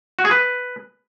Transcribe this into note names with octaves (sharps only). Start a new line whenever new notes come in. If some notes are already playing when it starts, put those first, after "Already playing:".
F#4
G#4
B4